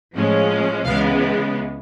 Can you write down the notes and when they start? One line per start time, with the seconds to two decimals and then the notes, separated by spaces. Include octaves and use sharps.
0.14 A2 F3 G#3 C#4
0.85 C#2 C#3 E3 G#3 B3 F5